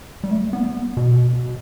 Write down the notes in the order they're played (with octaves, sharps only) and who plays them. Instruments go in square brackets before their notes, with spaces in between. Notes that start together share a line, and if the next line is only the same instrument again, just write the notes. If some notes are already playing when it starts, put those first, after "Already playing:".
[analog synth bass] G3
A3
B3
B2